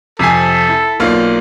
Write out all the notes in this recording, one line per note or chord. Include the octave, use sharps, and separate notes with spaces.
F2 C3 A4 G#5 B6 C7
E4
B1 A#3 D#4 F4 D5